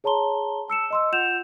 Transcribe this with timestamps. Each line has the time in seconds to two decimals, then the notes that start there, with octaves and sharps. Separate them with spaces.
0.04 G#4 C#5 A5 A#5 C6 G7
0.68 A5 E6 C#7 E7
0.90 D#5 C6 E6
1.12 F4 F#5 G6 E7 F7